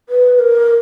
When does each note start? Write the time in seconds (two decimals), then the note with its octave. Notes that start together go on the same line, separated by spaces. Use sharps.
0.09 B4
0.39 A#4